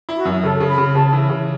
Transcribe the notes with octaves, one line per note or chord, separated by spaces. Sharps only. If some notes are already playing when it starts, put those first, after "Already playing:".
E4
F#4
F#2
C#3 A4
C#3
B5
C#3
C#3 A5
E3
C#3